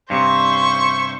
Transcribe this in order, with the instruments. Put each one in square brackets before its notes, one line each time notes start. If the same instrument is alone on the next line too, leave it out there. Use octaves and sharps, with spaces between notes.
[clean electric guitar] G2 C3 [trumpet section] C#4 E5 C#6 [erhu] C5